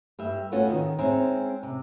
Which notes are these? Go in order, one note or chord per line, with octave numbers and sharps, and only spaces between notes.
G2 G4 E5
A3 B3 C#4 F4 F#4
D#3
G#3 C4 C#4 D#4 E5
C3